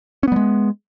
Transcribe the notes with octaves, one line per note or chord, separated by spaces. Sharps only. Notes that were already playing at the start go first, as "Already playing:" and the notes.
G3 G#3 B3 C#4